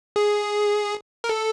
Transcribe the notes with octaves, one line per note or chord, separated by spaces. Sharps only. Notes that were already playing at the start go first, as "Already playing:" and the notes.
G#4
A#4
A4